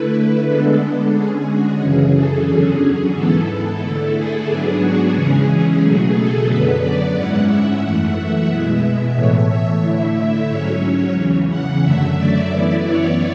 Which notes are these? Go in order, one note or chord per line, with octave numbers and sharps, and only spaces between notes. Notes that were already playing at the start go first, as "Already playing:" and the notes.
Already playing: D3 A3 E4 B4
B4
D3 G#3 B3 D4 A4
D3 G#3 C#4 G#4
F#4
F#2 C#3 E3 G#4
A4
E2 D3 F#3 C#4 G#4
G#4
G#2 E3 B3 E4 A4
D3 A3 E4
G#4
G#2 F#3 B3 D4 G#4
F#4
E2 C#3 E3 G#3 C#4 G#4
B2 F#3 A3
A4
F#2 D3 F#3 B3 B4
D5
G#2 G#3 C#4 E4 F#5
E5
F#2 E3 A3 F#5
E5
B2 G#3 B3 E4
A2 E3 A3 C#5
E5
D3 A3 E4 E5
G#2 F#3 C#4 C#5
C#5
E2 C#3 E3
F#5
F#2 D3 F#3 A3 E5
D5
F#2 E3 B3 E4
C#5